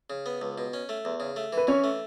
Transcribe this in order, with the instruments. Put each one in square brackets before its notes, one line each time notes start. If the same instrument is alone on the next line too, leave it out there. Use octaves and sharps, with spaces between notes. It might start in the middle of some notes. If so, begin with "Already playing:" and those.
[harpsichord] C#3
B3
C#2
B2
C#4
A3
E2
C#3
A3
[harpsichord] E3 [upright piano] B4
[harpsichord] E3 [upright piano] C#4 C#5
[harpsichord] A3